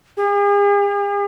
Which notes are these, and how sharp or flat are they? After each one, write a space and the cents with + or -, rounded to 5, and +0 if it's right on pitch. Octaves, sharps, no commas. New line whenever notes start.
G#4 -45